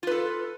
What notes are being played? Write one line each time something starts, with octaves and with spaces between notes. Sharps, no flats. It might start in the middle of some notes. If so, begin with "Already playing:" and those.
F4 A4 B4